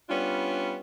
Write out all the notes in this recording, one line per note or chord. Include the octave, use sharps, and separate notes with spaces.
G3 B3 C#4 D4 F4